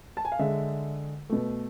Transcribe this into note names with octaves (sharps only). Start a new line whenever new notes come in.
A5
G#5
F5
D3 G#3 E5
B2 A3